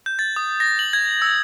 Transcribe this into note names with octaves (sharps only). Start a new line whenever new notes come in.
G6
A6
D#6
A#6
F#7
G#6
E6